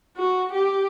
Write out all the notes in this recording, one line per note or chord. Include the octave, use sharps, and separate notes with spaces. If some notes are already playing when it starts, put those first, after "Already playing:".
F#4
G4